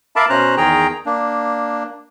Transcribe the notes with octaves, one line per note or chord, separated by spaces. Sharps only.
A#4 E5 F5 A5 B5 D6
B2 C#4 C5 A#5 F#6
E2 D#3 G#4 G5 A#5
A#3 D4